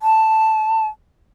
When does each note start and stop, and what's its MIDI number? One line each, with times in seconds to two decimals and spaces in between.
0.02 0.88 81